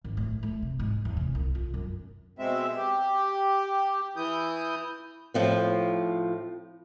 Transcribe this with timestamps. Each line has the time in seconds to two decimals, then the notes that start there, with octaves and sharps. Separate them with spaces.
0.04 G#1
0.17 A2
0.43 A3
0.62 C3
0.79 G#2
1.05 E2
1.17 C3
1.35 C2
1.55 F4
1.74 F#2
2.39 B2 G#3 C4 E5
2.77 G4
4.16 E3 E4 D#6 G6
5.34 A2 F3 C4